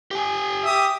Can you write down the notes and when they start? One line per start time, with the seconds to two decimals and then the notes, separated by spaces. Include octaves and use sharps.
0.11 G4 G#5
0.64 G4 E5 D#6